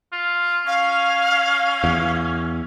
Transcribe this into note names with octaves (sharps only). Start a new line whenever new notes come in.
F4
C#4 F5
E2